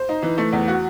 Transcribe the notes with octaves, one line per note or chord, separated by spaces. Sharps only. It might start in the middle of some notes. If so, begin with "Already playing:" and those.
Already playing: C5
D#4
E3
A3
E2
F#4